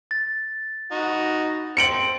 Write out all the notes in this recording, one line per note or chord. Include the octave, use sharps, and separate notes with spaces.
A6
D#4 F#4
C4 C#7 D7 F#7